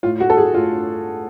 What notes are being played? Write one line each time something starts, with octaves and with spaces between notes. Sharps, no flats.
A2 F4
A3 F#4
A4
A2 G#4
A2 F4